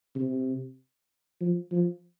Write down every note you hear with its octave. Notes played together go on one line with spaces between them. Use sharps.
C3
F3
F3